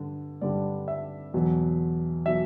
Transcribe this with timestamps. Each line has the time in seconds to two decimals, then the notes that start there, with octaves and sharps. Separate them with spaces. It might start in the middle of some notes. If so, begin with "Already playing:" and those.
Already playing: G2 D3
0.41 G2 D3 G3 D5
0.88 E5
1.34 E2 B2 F#3
2.26 B2 F#3 E5